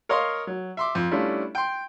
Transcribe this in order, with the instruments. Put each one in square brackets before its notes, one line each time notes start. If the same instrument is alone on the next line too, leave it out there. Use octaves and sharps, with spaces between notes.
[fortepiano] A#4 C#5 D#5 F5 C6
F#3
E5 C6 D6
F2
G3 A3 C#4 D4 E4 F4
G5 C6